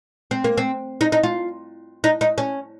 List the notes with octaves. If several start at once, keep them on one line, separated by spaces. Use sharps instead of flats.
C4
A#3
C4
D#4
D#4
F4
D#4
D#4
C#4